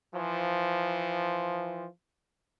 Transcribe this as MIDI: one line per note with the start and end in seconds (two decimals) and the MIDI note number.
0.15 1.86 52
0.15 1.86 53